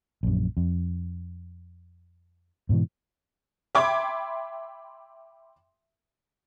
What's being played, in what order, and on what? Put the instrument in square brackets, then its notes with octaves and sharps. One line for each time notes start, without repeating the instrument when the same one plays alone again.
[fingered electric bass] A#1 F#2
F2
G#2 B2 D#3 E3
[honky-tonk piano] E5 G5 B5 C6 D6 G#6